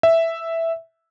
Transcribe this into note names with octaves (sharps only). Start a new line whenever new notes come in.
E5